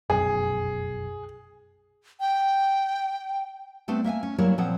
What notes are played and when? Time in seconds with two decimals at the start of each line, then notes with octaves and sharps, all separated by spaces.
0.10 F1 B1 F#2 G#4
2.20 G5
3.88 G3 A3 B3 C4 D4
4.04 A#3 E5 F#5 G#5
4.23 C#4
4.38 F#3 G3 A#3 E4 A#4 C#5
4.58 A#2 F3 C4 F#5